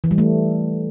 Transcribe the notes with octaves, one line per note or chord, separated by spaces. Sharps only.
E3
G3
A3